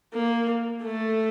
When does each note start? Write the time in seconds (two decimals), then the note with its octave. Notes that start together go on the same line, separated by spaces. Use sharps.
0.13 A#3
0.83 A3